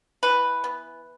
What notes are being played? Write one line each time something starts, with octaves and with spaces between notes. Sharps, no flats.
E3 B4
B3